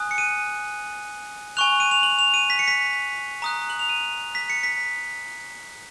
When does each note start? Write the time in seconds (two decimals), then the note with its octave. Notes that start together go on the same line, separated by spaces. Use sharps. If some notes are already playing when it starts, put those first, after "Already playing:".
Already playing: G#5 D#6 F#6
0.11 C#7
0.18 D#7
1.57 G#5 C#6 F#6 F7
1.80 D#7
1.91 F7
2.03 F#7
2.19 F7
2.34 D#7
2.50 B6
2.59 C#7
2.68 B6
3.42 A#5 D#6 F#6
3.70 F#7
3.79 F7
3.89 D#7
4.35 B6
4.50 C#7
4.63 B6